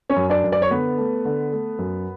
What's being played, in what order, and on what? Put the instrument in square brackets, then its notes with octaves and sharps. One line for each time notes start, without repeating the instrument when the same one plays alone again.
[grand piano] C#4 C#5
F#2
D4 D5
F#2
D5
C#5
D3 B3 B4
A3
D3
A3
F#2